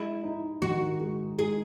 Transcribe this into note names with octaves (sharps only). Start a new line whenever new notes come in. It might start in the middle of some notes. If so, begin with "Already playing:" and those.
Already playing: G#3 E4
D#4
D#3 F#4
G#3
G#3 G#4